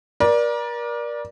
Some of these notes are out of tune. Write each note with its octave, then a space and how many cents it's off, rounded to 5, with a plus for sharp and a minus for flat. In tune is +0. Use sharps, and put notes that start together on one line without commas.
A#4 +35 D5 +0